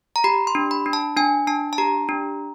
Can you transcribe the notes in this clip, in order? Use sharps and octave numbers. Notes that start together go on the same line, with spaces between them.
A#5
G4 B5
C6
D4
B5
D4
A5
D4 G#5
D4 A5
A5
G4 A#5
D4